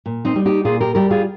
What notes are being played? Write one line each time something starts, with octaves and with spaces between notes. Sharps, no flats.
A#2
C4 D#4
G3
D#4 G4
A#2 F4 G#4
G4 A#4
G3 G4 A#4
F4 G#4